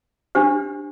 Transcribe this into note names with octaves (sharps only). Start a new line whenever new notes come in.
D4 G4 C5